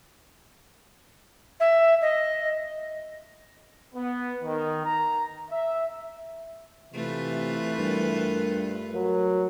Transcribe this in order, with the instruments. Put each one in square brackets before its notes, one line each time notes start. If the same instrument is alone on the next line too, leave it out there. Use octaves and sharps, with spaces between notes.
[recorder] E5
D#5
[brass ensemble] B3
D#3
A#5
E5
[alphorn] C3 [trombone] E3 [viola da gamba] A3 F4 B4
[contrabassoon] G2 [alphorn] A#4
[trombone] F#3 [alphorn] A#4